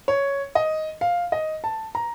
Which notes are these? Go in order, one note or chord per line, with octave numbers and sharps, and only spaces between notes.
C#5
D#5
F5
D#5
A5
A#5